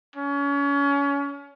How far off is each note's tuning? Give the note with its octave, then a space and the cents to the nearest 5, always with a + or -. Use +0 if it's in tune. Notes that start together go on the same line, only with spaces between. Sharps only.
C#4 +30